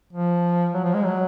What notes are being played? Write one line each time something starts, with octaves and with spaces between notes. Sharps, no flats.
F3
F#3
F3
G#3
F#3